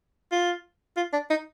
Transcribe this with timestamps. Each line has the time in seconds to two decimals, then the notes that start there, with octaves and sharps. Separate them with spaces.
0.32 F4
0.97 F4
1.13 D4
1.30 D#4